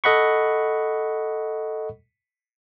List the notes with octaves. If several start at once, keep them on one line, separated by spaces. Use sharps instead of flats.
A4 D#5 F#5 B5 C#6